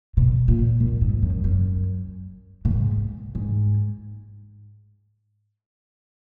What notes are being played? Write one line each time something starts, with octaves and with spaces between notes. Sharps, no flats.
B2
A#2
A#2
G#2
F#2
F#2
A#2
G#2
G#2